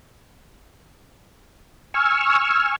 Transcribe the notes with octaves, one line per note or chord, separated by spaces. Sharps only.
G#5 C#6 E6 F6